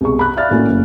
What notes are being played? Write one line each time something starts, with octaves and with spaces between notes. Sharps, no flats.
C2 B2 G#4 C#6
B5 F#6
D5 E5 F5 F6 A6
A2 A#3 C#4 E4 F#4
F#1